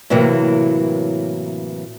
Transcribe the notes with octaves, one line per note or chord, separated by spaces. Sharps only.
A2 C3 E3 F#3 A#3